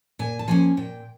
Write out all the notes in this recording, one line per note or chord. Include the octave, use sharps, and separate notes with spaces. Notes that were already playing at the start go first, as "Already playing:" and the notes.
A#2 G#5
A5
F3 A#3 C#4 G#5
A#2 G5